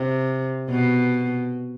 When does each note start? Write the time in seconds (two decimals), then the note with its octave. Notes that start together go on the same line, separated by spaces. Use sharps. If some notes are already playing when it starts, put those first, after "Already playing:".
Already playing: C3
0.69 B2